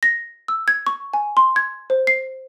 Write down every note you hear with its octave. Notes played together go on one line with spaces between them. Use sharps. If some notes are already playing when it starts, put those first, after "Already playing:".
A#6
E6
G#6
C#6
G#5
C6
G#6
C5
C7